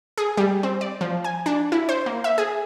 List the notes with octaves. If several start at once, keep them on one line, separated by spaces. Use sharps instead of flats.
G#4
G3
C4
D5
F3
G#5
D4
E4
C5
A#3
E5
G#4